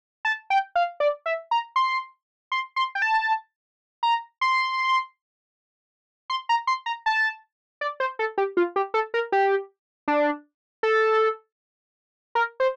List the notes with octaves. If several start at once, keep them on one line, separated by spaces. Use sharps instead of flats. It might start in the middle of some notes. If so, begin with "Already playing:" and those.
A5
G5
F5
D5
E5
A#5
C6
C6
C6
G5
A5
A#5
C6
C6
A#5
C6
A#5
A5
D5
C5
A4
G4
F4
G4
A4
A#4
G4
D4
A4
A#4
C5